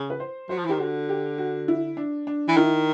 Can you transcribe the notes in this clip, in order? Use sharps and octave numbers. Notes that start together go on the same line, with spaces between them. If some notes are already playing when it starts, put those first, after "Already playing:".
Already playing: C#3
B4
C5
F#3 C5
F3
E3
D#3 G4
D3 F#4
G4
F#4
E4
D4
D4
E3
D#3 E4